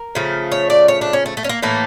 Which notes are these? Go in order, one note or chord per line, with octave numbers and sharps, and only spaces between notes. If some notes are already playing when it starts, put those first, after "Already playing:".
Already playing: A#4
C#3 F3 A3
C#5
D5
C#5
D4
C#4
A3
A3
C#4
A#3
A2 E3 A3 A#3